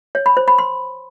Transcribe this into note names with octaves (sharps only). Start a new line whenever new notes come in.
C#5
B5
C5
B5
C6